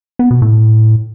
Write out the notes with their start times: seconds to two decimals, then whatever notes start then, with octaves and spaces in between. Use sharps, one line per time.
0.19 B3
0.31 B2
0.42 A2